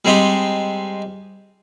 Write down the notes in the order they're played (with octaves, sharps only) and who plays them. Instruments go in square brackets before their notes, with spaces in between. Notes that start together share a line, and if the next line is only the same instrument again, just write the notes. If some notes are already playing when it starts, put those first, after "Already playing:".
[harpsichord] G3 G#3 C4 D#4 G4